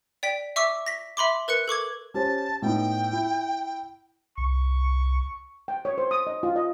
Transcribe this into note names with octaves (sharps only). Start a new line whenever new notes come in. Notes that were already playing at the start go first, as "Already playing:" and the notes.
D5 G5 B6
E5 C#6 D6 E6
A#6 B6
E5 B5 C6 D6
A#4 B4 F#6 C#7
A4 C#6 D6 G#6
C#4 G4 C5 A5
A2 B3 D#4 G5
E4
C2 C#6
G5
C#5
C5
D#6
D#5
F4
D#5